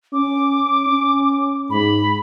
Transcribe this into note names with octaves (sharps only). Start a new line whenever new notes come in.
C#4 D6
C#4
G#2 B5